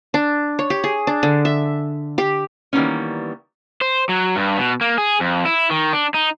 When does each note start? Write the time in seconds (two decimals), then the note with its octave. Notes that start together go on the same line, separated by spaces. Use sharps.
0.14 D4
0.59 C#5
0.70 G4
0.84 G#4
1.07 D4
1.23 D3
1.45 E5
2.18 G4
2.73 D#3 E3 G3 A#3 B3 C#4
3.81 C5
4.09 F#3
4.36 G2
4.58 B2
4.81 A#3
4.98 G#4
5.20 F2
5.45 E4
5.70 D#3
5.93 D4
6.14 D#4